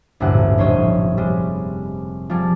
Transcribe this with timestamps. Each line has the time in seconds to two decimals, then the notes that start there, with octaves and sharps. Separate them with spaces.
0.20 A1 D2 G2 A#2 F#5
0.58 F1 C5 C#5 D#5
1.17 G3 G#3
2.30 F3 G3 G#4 A5